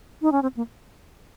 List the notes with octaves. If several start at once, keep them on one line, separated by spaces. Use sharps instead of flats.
D#4
C#4
C4
A#3